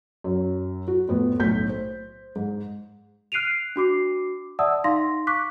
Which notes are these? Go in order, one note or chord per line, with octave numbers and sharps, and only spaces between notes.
F#2
F#4
F2 A2 B3
B1 A2 G6 B6
C5
G#2
F6 F#6 C7 D7 D#7 F7
D4 F#4 D6 C7
D5 E5 F#5 A5 D#6 E6
D#4 F5 C6 A#6
C#6 D6 F#6 B6